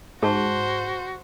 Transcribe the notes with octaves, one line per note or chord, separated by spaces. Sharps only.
G#2 F#4 G#4 C5 A5